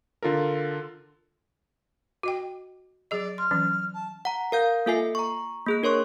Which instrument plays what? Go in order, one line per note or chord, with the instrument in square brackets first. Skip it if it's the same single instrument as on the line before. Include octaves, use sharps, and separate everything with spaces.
[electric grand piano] D3 F4 A4 A#4
[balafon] F#4 D#5 G5
[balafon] F#3 G#4 D#5 [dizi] D5
[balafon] C6 [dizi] F6
[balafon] E3 F#3 C#4
[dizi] A5
[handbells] F#5 A#5
A#4 F5 G6
A#3 F4 A4 E5 G#5 C7
A#5 C#6
A#3 G#4 F#6
D4 A#4 C#5 C6 C#6